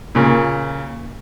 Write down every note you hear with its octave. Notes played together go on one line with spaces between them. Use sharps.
A#2 C#3